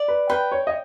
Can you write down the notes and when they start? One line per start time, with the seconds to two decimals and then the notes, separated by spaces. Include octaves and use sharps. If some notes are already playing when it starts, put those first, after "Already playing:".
Already playing: D5
0.08 B4
0.30 B4 G5
0.52 C#5
0.67 D#5